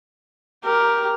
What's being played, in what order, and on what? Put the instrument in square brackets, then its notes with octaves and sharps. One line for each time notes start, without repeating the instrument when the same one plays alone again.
[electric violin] G4 [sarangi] A#4